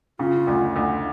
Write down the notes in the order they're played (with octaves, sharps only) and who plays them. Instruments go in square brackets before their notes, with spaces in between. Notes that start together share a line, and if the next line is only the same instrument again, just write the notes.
[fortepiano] C#3 [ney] F4
[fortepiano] D2
D2